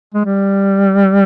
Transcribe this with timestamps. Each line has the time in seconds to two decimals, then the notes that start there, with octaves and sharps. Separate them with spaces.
0.14 G#3
0.25 G3